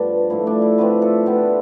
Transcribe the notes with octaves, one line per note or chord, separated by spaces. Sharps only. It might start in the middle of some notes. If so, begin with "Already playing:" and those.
Already playing: G2 F3 A3 B3 D4
A2 F3 A3 E4
D4
E4
D3 F3 A3 C4 B4
A4
B2 B3 D4 G4